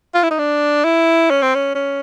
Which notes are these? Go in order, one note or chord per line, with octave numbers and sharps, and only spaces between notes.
F4
E4
D#4
D4
E4
C#4
C4
C#4
C#4